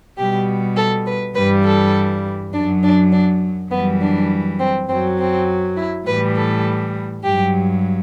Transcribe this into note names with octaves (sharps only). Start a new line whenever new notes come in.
B2 G3 G4
A4
B4
G2 E3 G3 B4
A4
F#2 F#3 D4
D4
D4
F#2 E3 G3 B3
D4
C4
F#2 F#3 C4
C4
E4
A2 E3 G3 B4
A4
G2 F#3 G4